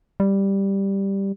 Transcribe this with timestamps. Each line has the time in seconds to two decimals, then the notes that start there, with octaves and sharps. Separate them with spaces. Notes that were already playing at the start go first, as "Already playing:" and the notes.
0.20 G3